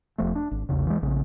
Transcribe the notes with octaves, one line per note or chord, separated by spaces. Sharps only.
E1 F3 A3
D4
G#1
A#1 E2 C#3
E3 G#3
A#1 C#3